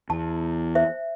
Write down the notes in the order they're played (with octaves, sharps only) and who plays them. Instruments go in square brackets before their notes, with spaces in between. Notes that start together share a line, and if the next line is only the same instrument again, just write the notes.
[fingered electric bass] E2 [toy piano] A5
[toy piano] C5 E5